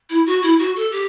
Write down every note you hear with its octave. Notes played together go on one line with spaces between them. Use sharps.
E4
F#4
E4
F#4
A4
G4